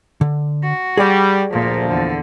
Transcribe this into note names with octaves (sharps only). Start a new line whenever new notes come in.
D3
F#4
G3 G#4 D5
D2 A#2 F3 A#3
E2 D3